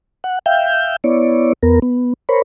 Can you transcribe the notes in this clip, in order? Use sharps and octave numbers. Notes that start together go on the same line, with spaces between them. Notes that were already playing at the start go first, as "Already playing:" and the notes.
F#5
E5 F5 G5 G6
B3 E4 C#5 D5
E2 B3 A#4
B3
A#4 C5 C#5 B5